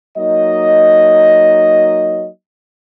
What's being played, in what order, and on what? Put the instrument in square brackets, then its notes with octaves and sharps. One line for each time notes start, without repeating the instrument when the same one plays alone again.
[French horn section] F#3 A#3 D#4 D#5